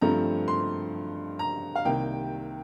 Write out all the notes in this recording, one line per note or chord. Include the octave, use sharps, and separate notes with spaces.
G2 F3 A3 C4 A#5
C6
A#5
F5
C2 C3 D#3 A#3 G5